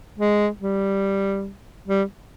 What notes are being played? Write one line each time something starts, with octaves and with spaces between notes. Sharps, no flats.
G#3
G3
G3